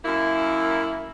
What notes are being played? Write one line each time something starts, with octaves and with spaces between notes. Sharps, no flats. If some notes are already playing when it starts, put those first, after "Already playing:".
F#2 A#3 E4